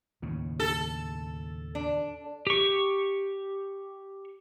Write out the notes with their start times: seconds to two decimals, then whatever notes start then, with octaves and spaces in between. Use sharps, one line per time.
0.22 D#2 A2 C#3
0.60 A4
1.75 D4
2.47 G4 C#6